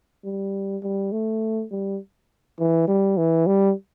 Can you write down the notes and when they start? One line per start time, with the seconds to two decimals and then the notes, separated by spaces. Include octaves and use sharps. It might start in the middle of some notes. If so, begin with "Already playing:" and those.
0.24 G3
0.83 G3
1.12 A3
1.72 G3
2.59 E3
2.88 G3
3.17 E3
3.47 G3